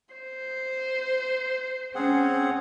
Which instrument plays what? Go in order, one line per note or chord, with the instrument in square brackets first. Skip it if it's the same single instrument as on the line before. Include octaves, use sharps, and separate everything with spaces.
[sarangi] C5
[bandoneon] C4 G#4 F#5 [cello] C#4